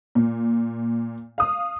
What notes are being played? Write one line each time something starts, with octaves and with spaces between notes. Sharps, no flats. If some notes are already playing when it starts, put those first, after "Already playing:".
A#2
F5 D#6